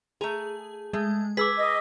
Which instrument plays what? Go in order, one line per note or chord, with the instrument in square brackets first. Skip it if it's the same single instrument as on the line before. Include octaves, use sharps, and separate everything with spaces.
[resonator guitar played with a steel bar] A3 A#5 [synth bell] G#4
[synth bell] G#3 [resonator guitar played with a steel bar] A3
[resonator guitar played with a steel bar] G#4 [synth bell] B4 [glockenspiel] D6 E6 B6
[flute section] D#5